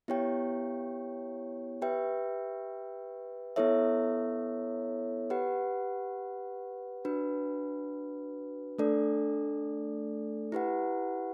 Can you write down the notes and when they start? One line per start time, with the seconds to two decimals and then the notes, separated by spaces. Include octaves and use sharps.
0.08 B3 E4 G4 C#5 G5
1.82 G4 B4 E5 G5
3.56 B3 E4 A4 C#5 E5
5.30 G4 B4 F#5
7.05 D4 F#4 B4
8.78 A3 D4 A4 D5
10.52 E4 G4 B4 F#5